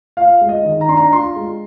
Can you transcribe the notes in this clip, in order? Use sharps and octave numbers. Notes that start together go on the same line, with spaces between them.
F4 F5
G#3
D#5
D#3
A#5
D4 C6
A#5
F4 C6
G#3